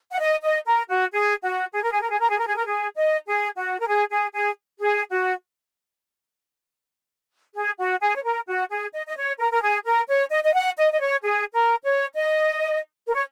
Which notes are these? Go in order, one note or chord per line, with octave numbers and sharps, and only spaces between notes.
F#5
D#5
D#5
A#4
F#4
G#4
F#4
G#4
A#4
G#4
A#4
G#4
A#4
G#4
A#4
G#4
A#4
G#4
D#5
G#4
F#4
A#4
G#4
G#4
G#4
G#4
F#4
G#4
F#4
G#4
C#5
A#4
F#4
G#4
D#5
D#5
C#5
A#4
A#4
G#4
A#4
C#5
D#5
D#5
F#5
D#5
D#5
C#5
G#4
A#4
C#5
D#5
A#4
C#5